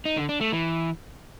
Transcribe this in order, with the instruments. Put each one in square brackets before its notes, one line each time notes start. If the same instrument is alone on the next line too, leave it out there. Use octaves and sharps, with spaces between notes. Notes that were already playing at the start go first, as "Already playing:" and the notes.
[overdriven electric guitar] D#4
D3
D4
A3
E3